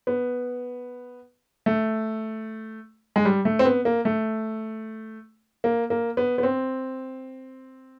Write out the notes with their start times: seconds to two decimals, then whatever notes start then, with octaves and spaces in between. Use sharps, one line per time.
0.07 B3
1.66 A3
3.16 G#3
3.25 G3
3.45 A3
3.59 C4
3.65 B3
3.85 A#3
4.05 A3
5.64 A#3
5.90 A#3
6.17 B3
6.38 B3
6.43 C4